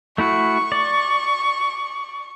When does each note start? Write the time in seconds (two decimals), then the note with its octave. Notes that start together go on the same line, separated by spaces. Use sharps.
0.18 A3 E4 F#4 C#6
0.72 D5